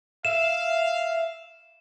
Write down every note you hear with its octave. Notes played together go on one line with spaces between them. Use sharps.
E5 F5 E7